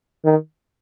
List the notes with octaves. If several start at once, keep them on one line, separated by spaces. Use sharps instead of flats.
D#3